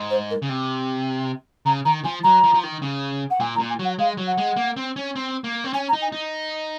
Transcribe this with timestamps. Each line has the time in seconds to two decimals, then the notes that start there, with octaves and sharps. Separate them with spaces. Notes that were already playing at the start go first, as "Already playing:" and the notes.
Already playing: G#2
0.10 C5
0.30 A#4
0.42 C#3
0.49 C3
1.65 C#3 A#5
1.85 D#3 A#5
2.04 F3 G#5
2.23 F#3 A#5
2.44 F3
2.54 F3
2.63 D#3
2.82 C#3
3.30 F#5
3.40 A#2 G#5
3.55 A#5
3.59 A#2
3.70 G#5
3.79 F#3
3.84 F#5
3.99 G#3 F5
4.17 F#3
4.27 F#5
4.38 G#3
4.56 A#3
4.77 C4
4.96 C#4
5.16 C4
5.44 A#3
5.64 C4
5.73 C#4 G#5
5.88 A#5
5.93 D#4
6.02 G#5
6.12 D#4